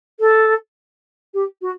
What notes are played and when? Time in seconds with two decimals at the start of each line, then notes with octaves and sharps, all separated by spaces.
0.20 A4
1.34 G4
1.61 F#4